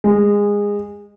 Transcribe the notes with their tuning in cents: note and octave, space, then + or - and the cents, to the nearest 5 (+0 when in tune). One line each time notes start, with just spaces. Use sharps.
G#3 -20